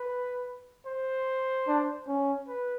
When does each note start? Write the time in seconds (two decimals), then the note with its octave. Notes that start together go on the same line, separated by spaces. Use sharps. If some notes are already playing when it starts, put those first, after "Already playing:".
Already playing: B4
0.87 C5
1.68 D4
2.08 C#4
2.48 B4